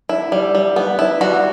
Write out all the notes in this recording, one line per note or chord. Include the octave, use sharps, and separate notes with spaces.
E4
G3
G3
B3
E4
G3 F#4